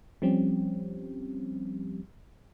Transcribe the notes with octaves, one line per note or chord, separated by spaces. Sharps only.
F3 G3 C4 C#4 G4